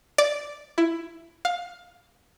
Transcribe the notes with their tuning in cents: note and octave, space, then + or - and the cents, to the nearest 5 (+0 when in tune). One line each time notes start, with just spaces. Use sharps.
D5 -5
E4 +15
F5 +15